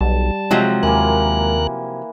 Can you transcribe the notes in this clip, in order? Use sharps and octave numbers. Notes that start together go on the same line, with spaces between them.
B1 G3 A5
C3 F3 F#3 G#3
D#2 E3 A#3 A#4 F#6